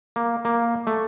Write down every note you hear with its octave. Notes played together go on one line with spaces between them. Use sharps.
A#3
A#3
A3